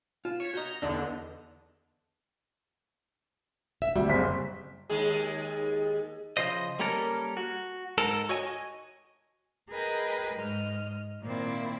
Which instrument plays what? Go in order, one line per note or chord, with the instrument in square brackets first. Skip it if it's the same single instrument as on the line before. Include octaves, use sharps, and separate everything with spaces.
[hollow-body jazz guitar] F4 [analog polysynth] E7
[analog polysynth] C#5 B6
[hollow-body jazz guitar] F#4 D#5 [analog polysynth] A#5 G6
[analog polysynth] E2 D3 [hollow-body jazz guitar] D4 D#5
[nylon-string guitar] E5
[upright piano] D2 [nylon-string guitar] G3
[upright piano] F#1 C4 B6
[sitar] D#2 G#3 G#4
[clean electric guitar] C#3 F3 C5 D#5
G3 A#3 C#4 A4 A#4
F#4
G#2 A4 A#4
F#4 C#5 D#5 G#5
[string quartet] G#4 A#4 B4 D#5 G5
G#2 D#5 F6
A#2 D#3 A#3 C4 E4